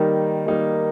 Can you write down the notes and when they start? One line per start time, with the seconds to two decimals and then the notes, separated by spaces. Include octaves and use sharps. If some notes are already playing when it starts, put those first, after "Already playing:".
Already playing: D#3 G3 A#3 D#4
0.46 D#3 G3 A#3 D#4